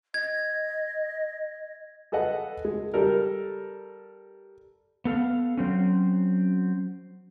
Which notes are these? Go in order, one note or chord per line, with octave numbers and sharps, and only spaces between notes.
D#5 G#6
G#4 A4 B4 D#5 F#5
G#3
G3 A4 A#4
B3 A4 F5
F#3 C4 C#4